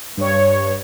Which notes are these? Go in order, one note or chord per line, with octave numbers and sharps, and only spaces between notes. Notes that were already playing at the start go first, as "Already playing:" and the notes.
G2 C#5